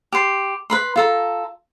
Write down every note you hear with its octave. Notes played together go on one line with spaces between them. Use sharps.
G4 C6
B4 B5 C6
F4 A4 A#5